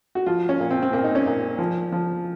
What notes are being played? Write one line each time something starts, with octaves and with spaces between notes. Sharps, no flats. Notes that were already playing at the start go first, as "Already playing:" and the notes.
F#4
F3 F4
C#4
A#2
C4
C4
A#2 A#3
D#4
C#4
A#2
F3
F3